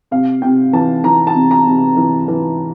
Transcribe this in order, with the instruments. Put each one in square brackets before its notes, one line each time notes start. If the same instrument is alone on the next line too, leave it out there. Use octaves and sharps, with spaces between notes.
[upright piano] C3 F5
C3 G5
E3 A5
E3 A#5
A5
C3
A#5
C3
E3
E3